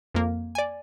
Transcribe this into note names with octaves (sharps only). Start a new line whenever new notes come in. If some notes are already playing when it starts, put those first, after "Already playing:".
F2 A#3
D5 G#5